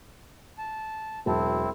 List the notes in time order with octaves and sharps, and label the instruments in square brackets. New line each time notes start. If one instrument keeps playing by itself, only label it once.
[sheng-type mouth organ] A5
[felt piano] E1 F#3 A5 [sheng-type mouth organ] C4 E4